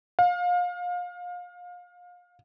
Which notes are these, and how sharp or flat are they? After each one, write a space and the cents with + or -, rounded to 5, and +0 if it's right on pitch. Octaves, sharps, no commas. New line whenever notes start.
F5 +30